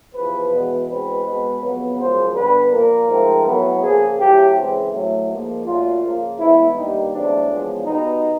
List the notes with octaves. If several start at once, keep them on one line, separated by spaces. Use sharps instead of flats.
E2 C3 F3 B4
E2 B2 G#3 B3
E2 B2 G#3 C4 B4
B2 G#3 B3
F2 C#3 F#3 B3
F#2 C#3 F3 G#3 C5
G2 D3 G3 B3 B4
A#2 F3 A#3 A#4
G#2 F3 A3 C4
A2 F#3 B3
C#3 F3 A#3 G#4
A2 F#3 A3 G4
C#3 E3 G#3 C4
A2 F#3 A3
G#2 F3 A#3
A#2 F#3 A3 F4
C#3 F3 A#3
A2 E3 G#3 B3 E4
G2 D#3 G3 A#3 D#4
E2 C#3 F#3 A3 C4 D4
E2 C#3 F3 G#3 B3
B2 G3 B3 D#4